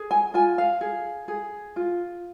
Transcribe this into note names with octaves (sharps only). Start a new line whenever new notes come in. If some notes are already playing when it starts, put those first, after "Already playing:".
Already playing: G#4
G#5
F4 G#5
F5
G#4
G#4
F4